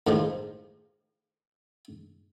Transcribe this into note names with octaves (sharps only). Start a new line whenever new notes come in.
A2 D#3 F3 G#3